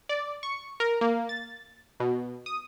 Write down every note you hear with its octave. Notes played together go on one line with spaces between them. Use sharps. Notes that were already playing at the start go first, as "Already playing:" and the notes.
D5
C#6
A#4
A#3
A6
B2
D#6